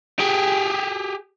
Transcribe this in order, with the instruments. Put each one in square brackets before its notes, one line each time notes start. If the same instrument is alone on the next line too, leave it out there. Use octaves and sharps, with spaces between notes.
[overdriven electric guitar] G4 G#4